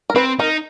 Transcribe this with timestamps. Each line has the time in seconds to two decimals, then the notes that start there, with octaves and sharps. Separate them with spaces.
0.10 A#4
0.15 C4 B4
0.39 D#4 A#4